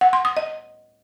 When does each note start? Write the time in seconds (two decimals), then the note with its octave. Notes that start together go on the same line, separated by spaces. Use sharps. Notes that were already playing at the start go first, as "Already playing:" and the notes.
0.01 F#5
0.13 C6
0.25 D#6
0.37 D#5